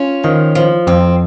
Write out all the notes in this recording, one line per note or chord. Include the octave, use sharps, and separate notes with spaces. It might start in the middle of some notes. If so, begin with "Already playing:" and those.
Already playing: C#4 F4
D#3 F3
F3
F2 C4